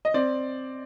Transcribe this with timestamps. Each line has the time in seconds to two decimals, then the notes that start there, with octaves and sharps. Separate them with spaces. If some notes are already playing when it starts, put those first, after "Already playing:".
0.05 D#5
0.14 C4 D5